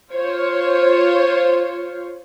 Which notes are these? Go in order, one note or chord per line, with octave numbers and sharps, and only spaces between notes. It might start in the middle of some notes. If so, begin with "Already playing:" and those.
F4 C5 C#5